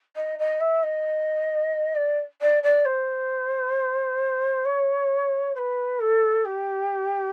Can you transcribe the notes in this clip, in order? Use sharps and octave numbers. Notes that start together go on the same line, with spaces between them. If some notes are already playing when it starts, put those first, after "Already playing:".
D#5
D#5
E5
D#5
D5
D5
D5
C5
C#5
C5
B4
A4
G4